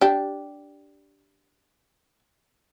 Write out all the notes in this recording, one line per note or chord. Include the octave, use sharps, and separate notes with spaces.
D4 G4